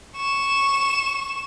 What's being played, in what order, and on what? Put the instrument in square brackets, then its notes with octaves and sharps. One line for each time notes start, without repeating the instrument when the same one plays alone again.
[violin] C#6 E7